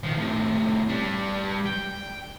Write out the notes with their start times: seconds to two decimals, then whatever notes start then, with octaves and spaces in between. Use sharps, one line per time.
0.04 D#3 F3
0.17 A2 C3
0.88 G3 D4
1.66 G5